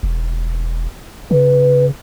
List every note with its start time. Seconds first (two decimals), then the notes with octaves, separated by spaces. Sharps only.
0.03 E1
1.31 C#3 B4